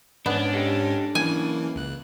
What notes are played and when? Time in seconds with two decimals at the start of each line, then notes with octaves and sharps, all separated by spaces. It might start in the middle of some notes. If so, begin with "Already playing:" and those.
0.26 G#2 B3 C#4 D4
0.53 D#4 G4 A4
1.15 F#2 C#3 E3 A#3 G#5
1.76 C#2 F#6